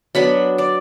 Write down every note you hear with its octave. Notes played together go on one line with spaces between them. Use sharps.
F#3 B3 D4 B5
D5